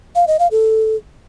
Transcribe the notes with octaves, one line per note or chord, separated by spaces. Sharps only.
F5
D#5
F5
A4